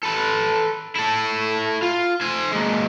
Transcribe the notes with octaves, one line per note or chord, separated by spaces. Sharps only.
A4 B4
E4 A4
F4
C5 G#5
G#3 A#3